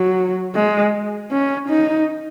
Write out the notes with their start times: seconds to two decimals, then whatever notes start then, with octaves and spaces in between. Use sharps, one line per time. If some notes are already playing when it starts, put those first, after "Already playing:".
Already playing: F#3
0.55 G#3
1.31 C#4
1.69 D#4